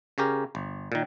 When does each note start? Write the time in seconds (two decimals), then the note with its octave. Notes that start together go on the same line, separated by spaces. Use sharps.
0.18 C#3 C#4 G4 A#4
0.55 G1
0.92 A#2 D#3